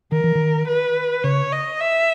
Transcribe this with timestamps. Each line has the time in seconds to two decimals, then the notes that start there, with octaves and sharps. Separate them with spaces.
0.12 D#3 A#4
0.24 E3
0.35 D#3
0.68 B4
1.24 C#3 C#5
1.52 D#5
1.80 E5